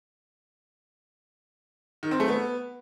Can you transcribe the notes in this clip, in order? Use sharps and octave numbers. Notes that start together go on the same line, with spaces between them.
D#3
C4
A3
B3